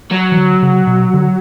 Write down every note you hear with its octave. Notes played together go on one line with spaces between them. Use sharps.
F#3
E3
D3
C#3
B2
D3